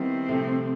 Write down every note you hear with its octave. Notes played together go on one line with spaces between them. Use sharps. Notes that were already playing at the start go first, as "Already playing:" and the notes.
Already playing: D#3 G3 B3 C4 E4
C3 F3 A3